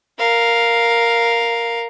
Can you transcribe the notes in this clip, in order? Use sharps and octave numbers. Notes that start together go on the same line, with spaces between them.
A#4 F5